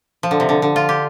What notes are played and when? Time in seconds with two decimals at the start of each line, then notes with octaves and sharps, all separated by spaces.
0.23 F3
0.31 D3
0.40 C3
0.49 D3
0.62 D3
0.76 F4
0.89 G4